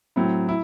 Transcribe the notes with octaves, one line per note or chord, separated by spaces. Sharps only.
A2 F#3 C4 E4
E4